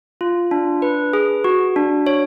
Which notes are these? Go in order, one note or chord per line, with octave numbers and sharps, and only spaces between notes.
F4
D4
B4
G#4
F#4
D4
C#5